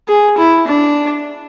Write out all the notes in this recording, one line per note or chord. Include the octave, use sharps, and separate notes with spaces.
G#4
E4
D4